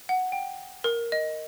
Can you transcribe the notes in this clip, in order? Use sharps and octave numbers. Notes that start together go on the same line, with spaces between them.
F#5
G5
A#4
D#5